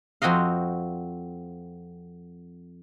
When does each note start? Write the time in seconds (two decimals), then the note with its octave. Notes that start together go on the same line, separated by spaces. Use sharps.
0.22 F2 C4 F#4 D#5 F5